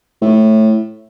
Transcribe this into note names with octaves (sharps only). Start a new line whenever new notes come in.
A2